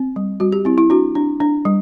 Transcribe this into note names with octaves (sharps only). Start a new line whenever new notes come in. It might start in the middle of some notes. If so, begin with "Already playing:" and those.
Already playing: C4
G3
G3 F#4
G4
C4 E4
E4
D4 F#4
D4
D4
G3